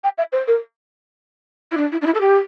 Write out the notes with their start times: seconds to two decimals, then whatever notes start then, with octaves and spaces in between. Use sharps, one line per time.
0.03 G5
0.18 E5
0.32 C5
0.47 A#4
1.71 E4
1.77 D4
1.92 E4
2.01 D4
2.06 E4
2.14 A4
2.20 G4